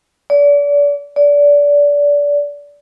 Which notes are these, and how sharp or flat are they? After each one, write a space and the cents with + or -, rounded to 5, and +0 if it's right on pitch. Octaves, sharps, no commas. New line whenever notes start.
D5 -35
D5 -25